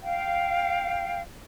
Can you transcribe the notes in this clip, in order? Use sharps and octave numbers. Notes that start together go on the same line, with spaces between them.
F5 G5